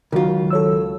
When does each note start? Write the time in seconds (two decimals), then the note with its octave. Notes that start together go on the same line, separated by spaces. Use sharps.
0.12 C#2 D#3 F#3 F4 F#4 A#4
0.50 A4 C#5 E6